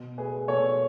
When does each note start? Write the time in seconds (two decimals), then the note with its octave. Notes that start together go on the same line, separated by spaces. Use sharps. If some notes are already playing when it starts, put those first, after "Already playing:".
Already playing: B2
0.18 A3 G#4 B4
0.48 B2 A4 C#5